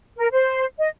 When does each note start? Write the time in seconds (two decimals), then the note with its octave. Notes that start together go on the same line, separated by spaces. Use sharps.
0.17 A#4
0.32 C5
0.78 D#5